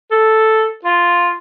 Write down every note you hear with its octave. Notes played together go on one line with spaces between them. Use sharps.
A4
F4